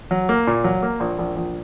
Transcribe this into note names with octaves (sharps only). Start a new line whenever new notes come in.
F#3
A#3
A#2
F#3
A#3
A#1
A#1
A#1